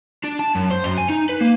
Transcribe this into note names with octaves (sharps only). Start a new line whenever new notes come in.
D4
A5
F#2
C5
F#2
G#5
D#4
B4
A#3